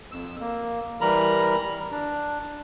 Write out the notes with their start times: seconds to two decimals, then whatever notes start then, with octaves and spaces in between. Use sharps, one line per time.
0.12 F2 E6
0.40 A#3
1.01 E3 G3 A#4 A#5 B5
1.92 D4